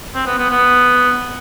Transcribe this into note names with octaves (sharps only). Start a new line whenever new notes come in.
C4
B3
B3
B3